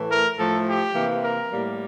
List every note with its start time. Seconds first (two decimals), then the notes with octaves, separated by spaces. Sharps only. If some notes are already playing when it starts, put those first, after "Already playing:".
Already playing: A2 E3 A3
0.09 A#4
0.38 A2 F3 A3 A4
0.67 G4
0.94 C3 E3 A#3
1.23 A#4
1.51 A2 G3 A#3